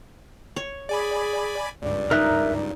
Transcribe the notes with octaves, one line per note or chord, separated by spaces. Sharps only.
C#5
G#4 D5 G#5 B5
C#2 G2 D5
D#4 A#4 E5 F#6